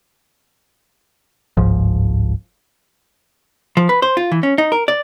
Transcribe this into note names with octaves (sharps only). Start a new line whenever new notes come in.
G1 C#2 G#2 F3
F3
B4
C5
F4
E3
C#4
D#4
A#4
D5